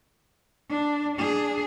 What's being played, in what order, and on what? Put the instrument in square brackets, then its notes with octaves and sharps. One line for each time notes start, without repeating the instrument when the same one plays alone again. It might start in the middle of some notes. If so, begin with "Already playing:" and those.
[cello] D4
D4 G#4